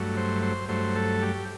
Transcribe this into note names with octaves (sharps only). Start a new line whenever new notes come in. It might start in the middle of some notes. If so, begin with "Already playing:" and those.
Already playing: G2 F#3 A3
C5
C5
G2 F#3 A3 C5
A4
G4